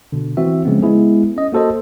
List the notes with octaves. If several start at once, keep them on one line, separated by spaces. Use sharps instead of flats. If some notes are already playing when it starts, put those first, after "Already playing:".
B2 D3
E3 C4 F#4 E5
C#3 F3 G#3 B3 C4
G#3 B3 E4 G#4
C#4 D#5
A#3 F#4 A4 C5 D#5